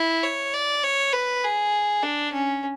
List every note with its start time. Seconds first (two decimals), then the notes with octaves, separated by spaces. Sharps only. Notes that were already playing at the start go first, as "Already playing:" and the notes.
Already playing: E4
0.23 C#5
0.54 D5
0.83 C#5
1.13 B4
1.43 G#4
2.03 D4
2.33 C#4